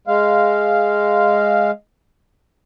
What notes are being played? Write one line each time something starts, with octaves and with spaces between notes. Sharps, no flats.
G#3 F5